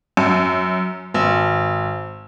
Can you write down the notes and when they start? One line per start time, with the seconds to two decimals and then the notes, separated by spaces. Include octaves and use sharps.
0.17 F#2
1.14 G#1